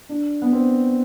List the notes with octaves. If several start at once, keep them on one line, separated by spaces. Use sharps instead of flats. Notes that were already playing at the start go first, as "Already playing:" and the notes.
D4
B3
C4